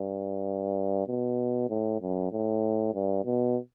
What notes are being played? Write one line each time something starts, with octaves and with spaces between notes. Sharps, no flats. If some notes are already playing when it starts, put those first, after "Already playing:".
Already playing: G2
B2
A2
F#2
A2
G2
B2